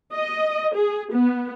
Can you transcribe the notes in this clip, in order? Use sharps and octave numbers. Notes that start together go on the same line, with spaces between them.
D#5
G#4
B3